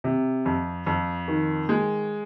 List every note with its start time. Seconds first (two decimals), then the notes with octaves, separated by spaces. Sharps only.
0.04 C3
0.46 F2
0.86 F2
1.28 D#3
1.69 G#3